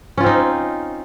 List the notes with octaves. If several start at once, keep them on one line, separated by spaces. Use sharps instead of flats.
C4 C#4 D#4 F4